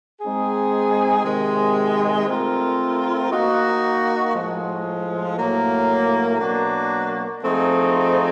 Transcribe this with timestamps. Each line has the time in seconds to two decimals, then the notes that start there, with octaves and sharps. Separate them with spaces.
0.21 G#3 C4 D#4 G#4
1.24 C3 D#3 G#3
2.27 A3 C4 F4 A#4
3.30 A#3 D#4 F#4
4.34 A2 F3 G#3
5.37 A2 F#3 A#3
6.40 B2 F#3 A#3 D4 F#4
7.43 F3 A3 C4 D#4 G#4